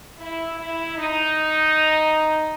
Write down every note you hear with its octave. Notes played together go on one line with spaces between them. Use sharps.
E4
E4
D#4